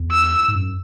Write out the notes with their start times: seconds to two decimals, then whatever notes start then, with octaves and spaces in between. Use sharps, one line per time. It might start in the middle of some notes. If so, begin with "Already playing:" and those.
Already playing: E2
0.12 E6
0.48 G#2
0.55 F#2